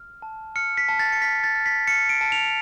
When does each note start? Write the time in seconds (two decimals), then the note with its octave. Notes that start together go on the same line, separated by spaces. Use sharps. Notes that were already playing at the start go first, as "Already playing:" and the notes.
Already playing: F6
0.22 A5
0.56 F6 C#7
0.77 B6
0.89 A5
0.99 A6
1.12 C#7
1.22 F6 B6
1.44 A6
1.55 F6
1.66 B6
1.87 F6 C#7
2.09 D7
2.21 A5
2.32 F7